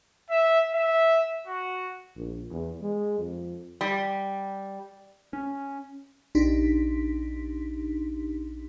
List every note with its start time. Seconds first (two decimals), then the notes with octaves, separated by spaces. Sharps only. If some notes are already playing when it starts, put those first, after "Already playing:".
0.29 E5
0.74 E5
1.47 F#4
2.16 A#1
2.51 E2
2.81 G#3
3.18 F2
3.81 G3
5.33 C#4
6.35 A#1 D4 D#4 G4 C6 B6